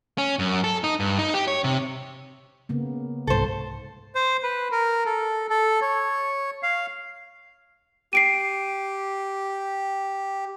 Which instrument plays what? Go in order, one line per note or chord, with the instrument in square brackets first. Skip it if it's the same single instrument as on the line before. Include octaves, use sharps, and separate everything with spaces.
[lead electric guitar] C#4
F#2
A4
D#4
G2
D#4
G4
C#5
C3
[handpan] C#3 A#3 B3
[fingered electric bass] C2 G#2 [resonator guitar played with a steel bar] A4 C5
[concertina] C5
B4
A#4
A4
A4
C#5
F5
[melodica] G4 [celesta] C7 D7 D#7